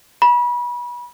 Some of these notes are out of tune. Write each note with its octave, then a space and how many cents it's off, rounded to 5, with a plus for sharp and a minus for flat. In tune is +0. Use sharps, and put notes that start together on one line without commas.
B5 -30